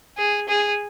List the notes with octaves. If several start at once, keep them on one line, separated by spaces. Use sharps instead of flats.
G#4
G#4